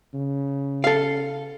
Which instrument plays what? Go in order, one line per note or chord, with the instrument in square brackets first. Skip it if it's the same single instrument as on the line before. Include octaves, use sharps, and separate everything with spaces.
[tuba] C#3
[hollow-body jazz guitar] A4 F5